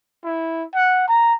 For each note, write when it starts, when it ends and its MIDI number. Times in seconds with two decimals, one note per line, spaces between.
0.24 0.63 64
0.74 1.04 78
1.08 1.33 82